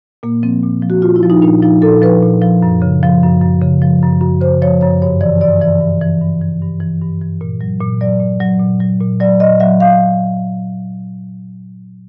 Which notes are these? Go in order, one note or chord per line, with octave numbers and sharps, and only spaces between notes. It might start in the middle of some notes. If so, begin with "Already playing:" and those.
A#2 A#3
F3 C4
A#2
F3
F#4
A#2 F4
E4
F3
D#4
A#2 D4
F3 D#4
A#2 A4
F3 B4
A#2
F3
F#2
C#3
F3
F#2
F#2
C#3
F3
F#2
F#2
C#3 C5
F3 C#5
F#2 C#5
G2 C#5
E3 D5
G2 D5
E3 D5
G2
E3
G2
E3
G2
E3
G2
E3
A#2
F#3
A#2
F#3 D5
A#2
F#3
A#2
F#3
A#2
F#3 D5
A#2 D#5
F#3 E5
F5